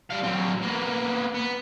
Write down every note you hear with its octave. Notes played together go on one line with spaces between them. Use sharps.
G3 F5
F#3 C4
A#3 B3
B3